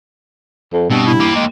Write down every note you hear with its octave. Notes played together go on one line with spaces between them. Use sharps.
F2
G2 B2 C4
E4
A#3 G4
G#3